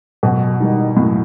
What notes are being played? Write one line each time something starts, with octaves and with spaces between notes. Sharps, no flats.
F#2 B2
D#3 G3 D#4
F#2 A2